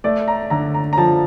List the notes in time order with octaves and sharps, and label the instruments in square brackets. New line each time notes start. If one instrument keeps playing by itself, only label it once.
[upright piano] A3 [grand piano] D5
[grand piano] A#5
[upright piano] D3 [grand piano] A#5
[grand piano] A#5
A#5
[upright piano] F3 [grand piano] A5